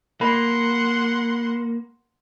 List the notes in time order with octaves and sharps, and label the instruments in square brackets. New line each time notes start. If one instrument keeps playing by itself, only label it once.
[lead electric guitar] A#3 [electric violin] F#5 C6 [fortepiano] B5